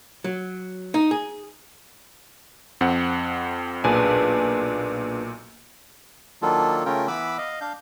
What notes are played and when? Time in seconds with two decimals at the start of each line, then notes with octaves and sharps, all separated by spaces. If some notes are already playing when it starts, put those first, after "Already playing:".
0.24 F#3
0.94 D#4
1.11 G#4
2.81 F2 C4 F#5
3.84 B1 A#2 D4 G#4 B4 G#5
6.42 D#3 F#3 A#3 D4 F4 A4
6.86 C#3 A3 C#4 F4 A#4 G5
7.08 E3 B3 B4 B5 D6 E6
7.38 D#5 F5
7.61 D4 F5 G6